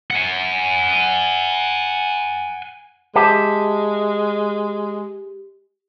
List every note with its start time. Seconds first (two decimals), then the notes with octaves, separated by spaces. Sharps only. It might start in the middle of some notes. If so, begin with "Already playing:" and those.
0.11 F#5 G#5
3.15 G#3 G4 E5 A5